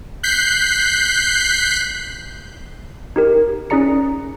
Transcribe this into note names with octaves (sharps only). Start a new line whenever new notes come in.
F#6 G6 B6 C7
D#4 G4 A#4
C#4 D#4 G#4 D5 A#5 C#7